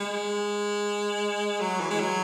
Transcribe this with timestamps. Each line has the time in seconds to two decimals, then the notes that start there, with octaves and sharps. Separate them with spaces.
0.01 G#3
1.61 F#3
1.80 E3
1.91 G#3
2.00 F#3